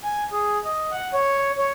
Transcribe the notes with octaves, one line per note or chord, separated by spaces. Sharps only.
G#5
G#4
D#5
F#5
C#5
C#5